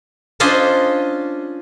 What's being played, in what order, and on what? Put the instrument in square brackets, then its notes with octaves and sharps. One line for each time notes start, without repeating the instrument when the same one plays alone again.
[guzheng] C#4 D4 F4 C5 D#5